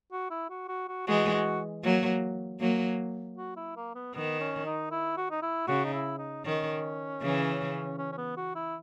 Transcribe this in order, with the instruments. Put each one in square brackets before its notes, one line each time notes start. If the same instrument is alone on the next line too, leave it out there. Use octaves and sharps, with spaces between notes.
[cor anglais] F#4
E4
F#4
F#4
F#4
[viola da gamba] E3 G#3 [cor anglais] F#4
[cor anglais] F#4
[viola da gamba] F#3 A#3
F#3 A#3
[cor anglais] F#4
E4
A#3
B3
[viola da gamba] D#3 [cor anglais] B3
[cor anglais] C#4
D#4
E4
F#4
D#4
E4
[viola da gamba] C#3 [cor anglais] F#4
[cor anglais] D#4
E4
D#4
[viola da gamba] D#3 [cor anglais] C#4
[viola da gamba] C#3 E3
[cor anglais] C#4
C#4
B3
F#4
E4